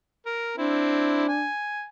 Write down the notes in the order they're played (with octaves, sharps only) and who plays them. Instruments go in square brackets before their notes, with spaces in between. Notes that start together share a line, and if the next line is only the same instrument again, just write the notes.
[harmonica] A#4
[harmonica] C4 E4 [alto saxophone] D4
[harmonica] G#5